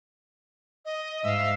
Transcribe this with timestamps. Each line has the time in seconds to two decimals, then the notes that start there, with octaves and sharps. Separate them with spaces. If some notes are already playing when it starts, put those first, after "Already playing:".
0.85 D#5
1.23 G#2 E5 F5